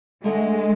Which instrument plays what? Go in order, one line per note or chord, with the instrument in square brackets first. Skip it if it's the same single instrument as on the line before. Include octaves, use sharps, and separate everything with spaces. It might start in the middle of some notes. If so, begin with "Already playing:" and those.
[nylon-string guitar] D2 D3 A3 [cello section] G#3